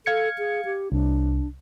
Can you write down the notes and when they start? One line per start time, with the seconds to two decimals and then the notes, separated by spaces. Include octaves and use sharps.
0.06 A4 F5 G#6 C#7
0.38 G#4
0.65 G4
0.92 C2 D4